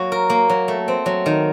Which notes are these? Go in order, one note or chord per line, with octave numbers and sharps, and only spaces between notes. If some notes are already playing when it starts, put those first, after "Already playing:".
Already playing: F#3 A#3 F#4
A#4
A#3
F#3
A3
C4
F#3
D#3